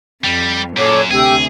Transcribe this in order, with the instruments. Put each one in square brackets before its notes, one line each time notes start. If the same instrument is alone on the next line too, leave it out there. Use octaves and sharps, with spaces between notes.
[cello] F2 [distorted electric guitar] G3
[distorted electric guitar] F#2 [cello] A#2 [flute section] A4 C#5 D6
[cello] D2 C3 [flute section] G4 G5 E6 [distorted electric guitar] G#4